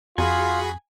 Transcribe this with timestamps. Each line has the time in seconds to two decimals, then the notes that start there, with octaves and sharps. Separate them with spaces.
0.18 F2 F4 F#4 G#4 G#5 B5